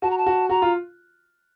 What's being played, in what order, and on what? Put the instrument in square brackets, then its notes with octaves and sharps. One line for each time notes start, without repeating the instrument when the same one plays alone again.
[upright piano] F#4 [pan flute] A5
[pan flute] A#5
A5
[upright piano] F#4
[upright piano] F#4 [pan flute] A#5
[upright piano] F4